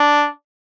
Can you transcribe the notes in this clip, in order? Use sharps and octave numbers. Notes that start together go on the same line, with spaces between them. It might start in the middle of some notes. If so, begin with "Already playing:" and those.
Already playing: D4